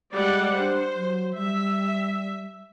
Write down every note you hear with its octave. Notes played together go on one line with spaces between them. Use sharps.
G3 G#3 D5 F#5
D4 C5
F#3
G3 E5